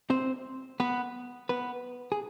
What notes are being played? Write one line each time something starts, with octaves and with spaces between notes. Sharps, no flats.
C4 C5
B3 B4
B3 B4
G#4